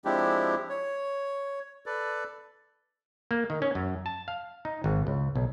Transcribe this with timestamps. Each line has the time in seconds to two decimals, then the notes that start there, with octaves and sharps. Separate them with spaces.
0.05 F3 G#3 C4 D4 E4 G4
0.69 C#5
1.86 A4 B4 D5
3.31 A#3
3.50 D#3
3.62 C#4
3.75 F#2
4.06 A5
4.28 F5
4.65 D#4
4.84 G#1
5.07 C#2
5.36 B1